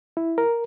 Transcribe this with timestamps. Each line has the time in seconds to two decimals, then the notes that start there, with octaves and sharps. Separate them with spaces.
0.17 E4
0.38 A#4